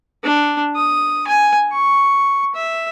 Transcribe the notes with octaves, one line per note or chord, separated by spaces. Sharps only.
D4
D#6
G#5
C#6
E5